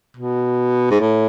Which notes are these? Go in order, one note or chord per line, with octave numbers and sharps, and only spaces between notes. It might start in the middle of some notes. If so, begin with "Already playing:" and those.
B2
G#2
A2